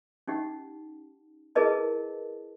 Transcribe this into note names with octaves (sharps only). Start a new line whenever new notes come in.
C#4 D#4 G4 F#5
E4 G#4 A#4 B4 D#5 A5